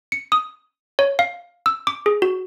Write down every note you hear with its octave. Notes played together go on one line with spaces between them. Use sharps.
C#7
D#6
C#5
F5
E6
D6
G#4
F#4